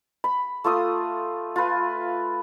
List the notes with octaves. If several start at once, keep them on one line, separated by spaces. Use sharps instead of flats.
B5
A3 F4 C6 D#6
F4 B4